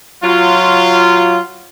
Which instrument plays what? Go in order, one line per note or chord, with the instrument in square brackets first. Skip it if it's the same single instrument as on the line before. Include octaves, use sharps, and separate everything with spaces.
[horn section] F#3 F4